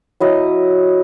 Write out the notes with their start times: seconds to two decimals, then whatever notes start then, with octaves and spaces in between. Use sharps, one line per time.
0.20 F#3 E4 D#5